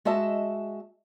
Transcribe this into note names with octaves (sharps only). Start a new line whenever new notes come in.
G#3 F#4 D#5 E5 A5